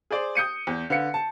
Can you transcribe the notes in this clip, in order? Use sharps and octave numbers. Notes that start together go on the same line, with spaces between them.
G#4 C5 D5
D#6 G6 C#7 D#7
E2
D3 B4 F5 C#7
A5